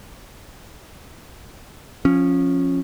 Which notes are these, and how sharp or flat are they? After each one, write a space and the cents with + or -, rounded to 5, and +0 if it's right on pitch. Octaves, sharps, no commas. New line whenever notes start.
F3 +10 C#4 -15